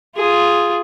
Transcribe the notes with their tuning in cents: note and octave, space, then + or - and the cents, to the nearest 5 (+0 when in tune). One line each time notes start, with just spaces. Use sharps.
F4 +0 G#4 +0